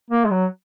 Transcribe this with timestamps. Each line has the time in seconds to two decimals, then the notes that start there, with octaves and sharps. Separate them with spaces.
0.10 A#3
0.25 G#3
0.31 F#3